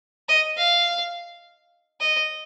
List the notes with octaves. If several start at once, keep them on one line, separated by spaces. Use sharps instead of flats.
D#5
F5
D#5